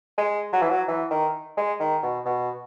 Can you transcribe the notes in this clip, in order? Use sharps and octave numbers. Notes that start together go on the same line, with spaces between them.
G#3
F#3
E3
F#3
E3
D#3
G#3
D#3
B2
B2